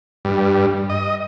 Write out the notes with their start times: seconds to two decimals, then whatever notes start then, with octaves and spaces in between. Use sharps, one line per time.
0.25 G2
0.89 D#5